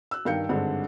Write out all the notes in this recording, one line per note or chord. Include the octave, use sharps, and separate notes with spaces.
E6 F#6
G2 D#3 F5 G5 G6 C#7
G#1 G2 D3 G#3